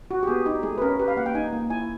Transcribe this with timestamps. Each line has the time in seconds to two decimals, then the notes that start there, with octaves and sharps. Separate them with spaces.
0.11 F#4
0.23 G4
0.27 B3 G#4
0.46 D#4 G4
0.63 A3 G#4
0.78 B4
0.82 C#4 A#4
0.99 G4 B4
1.08 F5
1.17 A#3 F#5
1.26 G5
1.35 D#4 G#5
1.53 A#3
1.70 E4 G#5